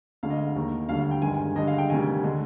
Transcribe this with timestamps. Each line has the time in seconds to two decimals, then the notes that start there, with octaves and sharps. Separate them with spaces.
0.23 D2 D3 G#3 F5
0.30 D#5
0.37 F5
0.55 D#2 D#3 A#3
0.89 D2 D3 G3 F5
1.00 F5
1.11 G5
1.22 G1 G2 D#3 G#3 G#5
1.34 G#5
1.55 G2 D3 G#3 D#5
1.67 F5
1.78 G5
1.90 D2 C3 D#3 G3 G#5
2.23 D3 G#3